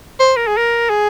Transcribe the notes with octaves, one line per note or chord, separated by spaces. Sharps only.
C5
A#4
G#4
A#4
G#4